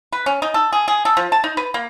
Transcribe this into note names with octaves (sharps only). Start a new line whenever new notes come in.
B4
C#4
D#4
A4
G#4
G#4
A4
F3
A5
D#4
B4
A#3